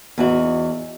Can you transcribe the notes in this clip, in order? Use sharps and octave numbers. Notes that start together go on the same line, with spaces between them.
E2 D#4 F#4